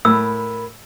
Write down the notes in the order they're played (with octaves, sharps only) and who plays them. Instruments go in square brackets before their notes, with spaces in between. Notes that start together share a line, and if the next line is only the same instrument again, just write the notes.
[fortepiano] A2 [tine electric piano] A#4 B5 [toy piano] E6